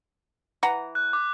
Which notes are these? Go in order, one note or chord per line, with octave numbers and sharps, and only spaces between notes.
E3 F#5 A#5
F#6
D6